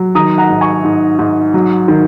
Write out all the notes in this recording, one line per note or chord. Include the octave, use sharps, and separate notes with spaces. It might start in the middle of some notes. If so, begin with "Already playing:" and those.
Already playing: F#3
D#3 A#5 D#6
F#5 A#5
G#2
G#5 C#6
G#2
G#2
F#3
D#3